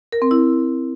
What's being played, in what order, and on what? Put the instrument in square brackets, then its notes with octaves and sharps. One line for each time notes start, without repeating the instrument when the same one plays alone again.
[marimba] A#4
C4
E4